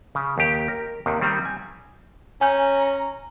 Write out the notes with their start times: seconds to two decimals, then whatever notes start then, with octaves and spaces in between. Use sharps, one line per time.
0.15 C#3
0.38 D#2 G4
0.68 A#4
1.06 D#2 C3 D#3
1.21 D#3 G3 C4
1.45 G#5
2.41 C#4 G#5 A#5 G6